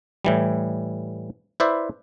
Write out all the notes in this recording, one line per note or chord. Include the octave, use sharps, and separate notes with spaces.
A2 E3 G3
E4 B4 C5 D5 E5